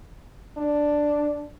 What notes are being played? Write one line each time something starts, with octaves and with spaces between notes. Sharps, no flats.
D4